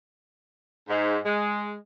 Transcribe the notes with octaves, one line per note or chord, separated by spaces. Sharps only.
G#2
G#3